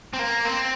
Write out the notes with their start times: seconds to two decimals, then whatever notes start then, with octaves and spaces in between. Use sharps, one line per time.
0.13 C4
0.19 A#3
0.45 C4